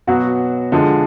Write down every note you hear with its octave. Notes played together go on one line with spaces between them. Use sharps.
B2 F#3 B3 F#4
D3 F3 G#3